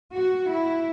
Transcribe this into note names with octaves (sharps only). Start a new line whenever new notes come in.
F#4
E4